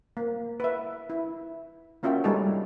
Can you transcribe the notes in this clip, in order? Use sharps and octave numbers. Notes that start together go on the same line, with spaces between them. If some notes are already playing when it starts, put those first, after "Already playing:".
A#3
B4 E5
E4
A#3 C#4 F4 F#4 E5 G5
G3 G#3 D#4 G4 A4 C#5